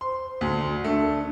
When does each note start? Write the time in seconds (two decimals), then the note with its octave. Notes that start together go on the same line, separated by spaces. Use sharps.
0.01 C5 C6
0.41 D2 D3
0.84 A3 D4